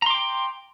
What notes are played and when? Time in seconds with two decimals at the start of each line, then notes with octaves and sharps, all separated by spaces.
0.02 A#5
0.06 C6
0.10 D6
0.14 G5